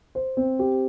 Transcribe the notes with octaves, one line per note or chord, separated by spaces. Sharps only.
C5
C4
G4